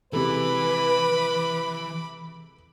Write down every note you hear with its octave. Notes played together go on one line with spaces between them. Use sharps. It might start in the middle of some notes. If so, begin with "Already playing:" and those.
C3 E3 G#3 A4 B4 B5 D6